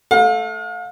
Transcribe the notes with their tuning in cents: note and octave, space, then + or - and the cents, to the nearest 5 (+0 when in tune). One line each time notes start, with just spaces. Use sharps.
A3 +0 F5 +40